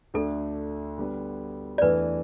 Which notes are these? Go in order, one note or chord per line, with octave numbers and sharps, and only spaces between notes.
D2 D3 A3 D4 A4
D3 G3 B3
D5
E2 E3 A3 D4 A4 B4